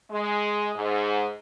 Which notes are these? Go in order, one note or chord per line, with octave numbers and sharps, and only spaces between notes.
G#3
G#2